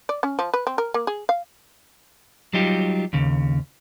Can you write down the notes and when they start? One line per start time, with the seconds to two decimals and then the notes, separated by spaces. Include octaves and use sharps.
0.09 D5
0.23 C#4
0.39 F3
0.54 B4
0.67 C4
0.78 A#4
0.94 A#3
1.07 G#4
1.29 F5
2.53 F#3 G3 D#4 F4 G4
3.13 D#2 C#3